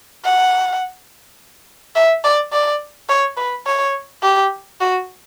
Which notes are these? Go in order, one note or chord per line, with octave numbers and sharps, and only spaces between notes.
F#5
E5
D5
D5
C#5
B4
C#5
G4
F#4